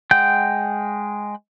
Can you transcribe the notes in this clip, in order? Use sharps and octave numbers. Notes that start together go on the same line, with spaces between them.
G#3 F#5 G5 G6